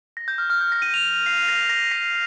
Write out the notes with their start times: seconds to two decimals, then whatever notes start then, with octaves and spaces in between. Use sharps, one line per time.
0.17 A#6
0.28 G6
0.38 F6
0.50 F6
0.61 G6
0.72 A#6
0.82 D#7
0.94 F7
1.04 D#7
1.26 C7
1.48 A#6
1.69 A#6
1.91 C7